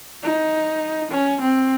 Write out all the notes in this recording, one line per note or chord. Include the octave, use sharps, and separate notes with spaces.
D#4
C#4
C4